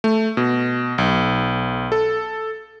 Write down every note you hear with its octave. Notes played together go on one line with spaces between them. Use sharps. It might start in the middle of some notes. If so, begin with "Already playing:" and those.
A3
B2
B1
A4